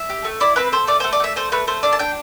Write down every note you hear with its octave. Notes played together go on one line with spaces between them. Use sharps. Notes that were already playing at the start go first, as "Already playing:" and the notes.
Already playing: E5
G4
A3
E4 D5
C4 B4
A4 C5
A3 D5
C5
A3
D5
A3 E5
A3 C5
A3 B4
A3 C5
D4 D5
A5
D4 G5